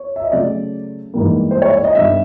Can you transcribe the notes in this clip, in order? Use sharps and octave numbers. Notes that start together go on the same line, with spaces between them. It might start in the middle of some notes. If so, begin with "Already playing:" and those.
Already playing: C#5
E5
D#5
C#3 F#3 A3 D5
G#2 E3 G3 A#3
C5
C#5
D5
D#5
G2 D#3 G3 B3 E5